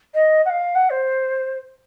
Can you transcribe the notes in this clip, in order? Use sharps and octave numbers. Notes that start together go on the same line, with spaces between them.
D#5
F#5
F5
F#5
C5